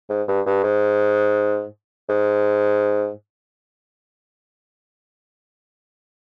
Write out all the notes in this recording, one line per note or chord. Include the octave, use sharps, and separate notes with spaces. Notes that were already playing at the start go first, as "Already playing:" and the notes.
G#2
G2
G2
G#2
G#2